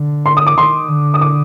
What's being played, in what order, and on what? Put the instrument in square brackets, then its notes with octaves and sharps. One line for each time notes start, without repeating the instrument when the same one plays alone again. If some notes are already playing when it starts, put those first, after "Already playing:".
Already playing: [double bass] D3
[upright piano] C6
D#6
D6
[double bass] D#3 [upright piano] C6
[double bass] D3
[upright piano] D#6
D6